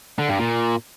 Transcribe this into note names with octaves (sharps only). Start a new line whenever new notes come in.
D3
G2
A#2